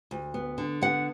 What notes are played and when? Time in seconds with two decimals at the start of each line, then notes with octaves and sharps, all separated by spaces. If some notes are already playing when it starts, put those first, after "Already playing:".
0.11 D2
0.34 B3
0.58 D3
0.81 B3 F#5